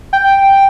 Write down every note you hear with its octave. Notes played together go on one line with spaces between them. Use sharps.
G5